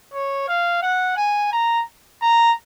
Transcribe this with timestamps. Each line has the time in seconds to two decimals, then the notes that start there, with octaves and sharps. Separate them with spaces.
0.14 C#5
0.48 F5
0.82 F#5
1.17 G#5
1.52 A#5
2.22 A#5